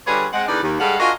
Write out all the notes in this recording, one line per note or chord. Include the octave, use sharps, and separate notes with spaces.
D3 G3 F4 G#4 B4 C#5
G#3 C4 F#5
E2 D3 D#4 B4 D5
D#2
G2 G3 G#3 A4 F5 F#5
D4 F4 F#4 G#4 A#4 D#5